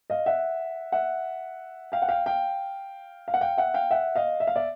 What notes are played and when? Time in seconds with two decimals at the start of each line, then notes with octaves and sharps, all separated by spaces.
0.10 D#5 F5
0.26 E5 F#5
0.92 E5 F#5
1.92 F5 G5
2.02 F#5
2.08 F5 G5
2.26 F5 G5
3.28 F5
3.34 F#5
3.41 F5 G5
3.57 E5 F#5
3.74 F5 G5
3.91 E5 F#5
4.15 D#5 F5
4.40 E5
4.47 F5
4.56 D5 E5